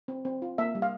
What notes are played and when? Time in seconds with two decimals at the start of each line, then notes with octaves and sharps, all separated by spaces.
0.08 C4
0.25 C4
0.42 F4
0.58 A#3 E5
0.75 G3
0.82 F5